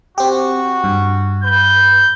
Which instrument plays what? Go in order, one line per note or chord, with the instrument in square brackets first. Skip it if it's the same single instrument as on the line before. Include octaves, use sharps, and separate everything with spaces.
[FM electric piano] C4 G4 [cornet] F#4
[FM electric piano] G2
[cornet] B4 [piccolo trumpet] G6